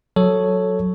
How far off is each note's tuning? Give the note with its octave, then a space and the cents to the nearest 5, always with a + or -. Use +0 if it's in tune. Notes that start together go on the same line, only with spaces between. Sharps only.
F#3 +0 A4 +0 C#5 +0